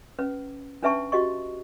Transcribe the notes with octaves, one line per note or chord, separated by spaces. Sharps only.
C#4 B4
C#4 D4 B4 E5 A5 C#6
F#4 G4 D#5 C#6